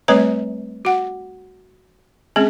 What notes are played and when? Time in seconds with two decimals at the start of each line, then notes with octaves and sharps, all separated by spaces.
0.08 G3 A3 C4 B4 C#5 A#5
0.85 F#4 F#5
2.36 G#3 C4 C#4 G#4